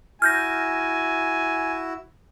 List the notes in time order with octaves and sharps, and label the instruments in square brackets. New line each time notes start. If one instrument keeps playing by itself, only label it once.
[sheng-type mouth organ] E4 F#4 [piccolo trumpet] G#5 [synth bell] F6 G6 A#6